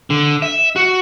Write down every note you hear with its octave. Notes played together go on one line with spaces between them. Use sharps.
D3
E5
F#4